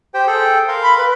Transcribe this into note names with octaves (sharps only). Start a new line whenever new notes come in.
G4 C5 G5
G#4 A4 G5
A#4 F5 C6
B5
B4